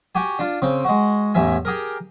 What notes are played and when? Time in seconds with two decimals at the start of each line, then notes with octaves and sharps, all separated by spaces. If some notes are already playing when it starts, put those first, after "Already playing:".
0.15 F#4 G4 G#5
0.39 D4 F4
0.62 C#3 C4
0.85 G#3 F#4
1.34 A1 E2 E5 G#5
1.65 G4 G#4 A#4